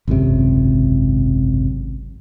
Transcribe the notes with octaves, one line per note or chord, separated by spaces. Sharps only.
G#1 C#2 F#2 C3